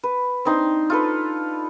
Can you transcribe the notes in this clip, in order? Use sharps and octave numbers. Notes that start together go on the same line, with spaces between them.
B4
C4 D4 D#4 C6
F4 A4 B4